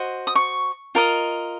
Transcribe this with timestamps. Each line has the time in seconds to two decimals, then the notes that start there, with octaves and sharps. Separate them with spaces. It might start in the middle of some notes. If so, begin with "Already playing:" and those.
Already playing: F#4 C5 D#5
0.27 D#6
0.35 C#6
0.95 F4 A#4 D#5